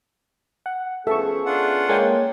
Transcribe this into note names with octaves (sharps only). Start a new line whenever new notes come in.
F#5
F3 B3 C#4 G#4 A4 E5 C#6
D4 F4 F#5
G#3 A#3 C#5 G5 G#5